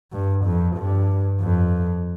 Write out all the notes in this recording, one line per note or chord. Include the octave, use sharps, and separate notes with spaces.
G2
F2
G2
F2